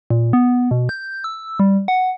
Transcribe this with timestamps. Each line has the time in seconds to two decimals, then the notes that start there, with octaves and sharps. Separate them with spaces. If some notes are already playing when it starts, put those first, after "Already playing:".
0.10 A#2
0.33 B3
0.71 B2
0.89 G6
1.24 E6
1.59 G3
1.88 F#5